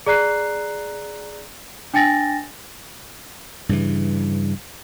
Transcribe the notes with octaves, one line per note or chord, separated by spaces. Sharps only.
G#4 D5 A#5 F#6 C7
D4 G5 G#5 A6 A#6
G2 C#3 E3